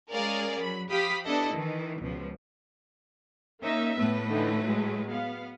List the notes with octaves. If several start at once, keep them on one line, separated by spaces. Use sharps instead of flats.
G#3 C#4 G#4 A#4 D5 F5
F#3 B5
F3 G4 F5 B5 D#6 B6
B3 D4 E4 A4 D#5
D#3 E3
C#2 B2 F3
A#3 C#4 D#4 E5
A2 A3 B3 B4
D3 E3 D#4
F#3 G#3
B3 F5